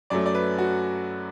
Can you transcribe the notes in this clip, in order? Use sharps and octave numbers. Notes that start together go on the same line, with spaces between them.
F#2 F#3 A3 D5
D5
B4
F#4